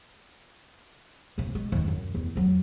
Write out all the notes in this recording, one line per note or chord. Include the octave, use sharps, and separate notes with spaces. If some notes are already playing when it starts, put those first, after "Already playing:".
B1 C#3
G#3 C#4
E1 D#2
F#2
E2
F2 F#3